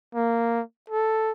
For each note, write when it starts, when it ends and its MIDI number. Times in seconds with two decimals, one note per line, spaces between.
0.15 0.62 58
0.90 1.32 69